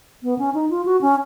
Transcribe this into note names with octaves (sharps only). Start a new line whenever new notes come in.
B3
C#4
D#4
F4
F#4
C#4